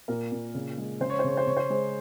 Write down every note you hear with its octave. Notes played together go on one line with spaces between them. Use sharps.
A#2 A#4
A#2
C#3
G#3
C#3 C5
C#5
C5
C#3 C#5
C5
C#3 C#5
C5
G#3